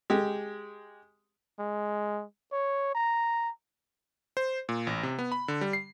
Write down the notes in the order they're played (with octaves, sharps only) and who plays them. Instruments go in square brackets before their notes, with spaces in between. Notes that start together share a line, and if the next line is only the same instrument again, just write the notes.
[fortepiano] G#3 G4
[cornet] G#3
C#5
A#5
[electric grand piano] C5
A#2
A1
C3
B3
B5
D3
G3
C7